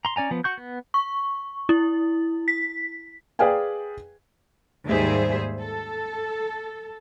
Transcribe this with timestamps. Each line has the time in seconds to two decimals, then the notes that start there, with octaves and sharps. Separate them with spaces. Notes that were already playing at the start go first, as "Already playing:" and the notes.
0.05 A#5 C6
0.16 C#4 D5 G#5 A#5
0.31 F3 B3
0.44 F#4 C#6 G6
0.57 B3
0.94 C#6
1.69 E4
2.48 B6
3.39 G#4 B4 D5 F5 G5 G#5
4.86 D#2 G#2 G3 G#4 C5 E5
5.59 A4